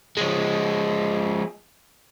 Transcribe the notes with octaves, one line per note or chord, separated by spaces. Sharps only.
F3 G#3